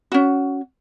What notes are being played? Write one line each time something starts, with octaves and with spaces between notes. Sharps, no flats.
C#4 F#4